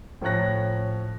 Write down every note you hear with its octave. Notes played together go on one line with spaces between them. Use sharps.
A2 F3 C#4 C#5 F#6 A#6